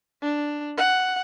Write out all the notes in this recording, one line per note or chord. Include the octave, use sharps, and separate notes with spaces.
D4
F#5